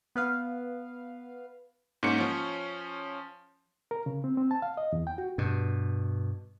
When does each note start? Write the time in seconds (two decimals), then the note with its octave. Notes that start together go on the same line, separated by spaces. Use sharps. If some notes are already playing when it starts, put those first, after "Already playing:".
0.16 B3 B4 F5
2.03 G#2 A#3 C#4 C#7
2.18 F3 C#4
3.91 A#4
4.06 C#3
4.24 C4
4.37 C4
4.51 A5
4.62 F5
4.77 D#5
4.92 E2
5.07 G5
5.18 F#4
5.38 G2 B2